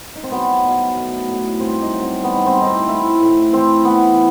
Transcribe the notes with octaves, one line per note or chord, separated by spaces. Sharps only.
D#4
C4
F#3 B3
B2
A3
A2
G2 C4
D#4
F#3
C4
G3 B3
D#4
C4
A2
D#4
C4
A2 E4
A2
E3 C4
E3 B3